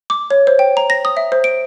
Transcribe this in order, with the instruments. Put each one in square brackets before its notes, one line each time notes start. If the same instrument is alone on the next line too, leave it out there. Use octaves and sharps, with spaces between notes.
[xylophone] D6
C#5
C5
G5
A#5
A#6
D#6
E5
C5
D7